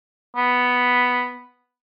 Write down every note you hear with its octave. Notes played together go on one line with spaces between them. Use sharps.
B3